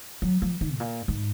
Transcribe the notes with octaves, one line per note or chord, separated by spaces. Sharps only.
F#3
F3
D#3
A2
A#2
G#2